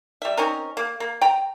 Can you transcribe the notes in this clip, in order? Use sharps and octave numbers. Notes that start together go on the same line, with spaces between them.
G3 E5
C4 C#4 D#4 A#4
A#3
A#3
G5 A#5